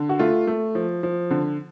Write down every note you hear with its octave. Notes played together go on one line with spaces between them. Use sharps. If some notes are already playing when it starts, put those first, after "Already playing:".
Already playing: D3
F#4
A3 F4
A3
F3
F3
D3